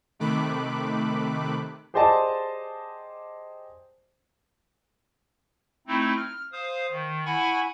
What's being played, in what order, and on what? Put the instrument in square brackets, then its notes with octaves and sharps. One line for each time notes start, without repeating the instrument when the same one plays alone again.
[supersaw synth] C3 D#3 A3 B5 D6 F#6
[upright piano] G4 G#4 C5 D5 D#5 A5
[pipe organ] A3 C4 D#4 E4
F6
C5 F5 D#6
D#3
E4 F#5 G#5 B5 C#6